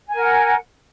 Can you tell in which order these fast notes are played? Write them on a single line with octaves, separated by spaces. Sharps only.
G#5 A#4 F#5